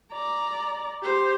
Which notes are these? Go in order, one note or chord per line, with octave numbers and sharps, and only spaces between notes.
D5 A#5
G4 C5